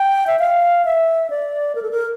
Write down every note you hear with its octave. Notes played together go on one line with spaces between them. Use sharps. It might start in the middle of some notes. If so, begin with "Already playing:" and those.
Already playing: G5
E5
F5
E5
D5
A#4
A4
A#4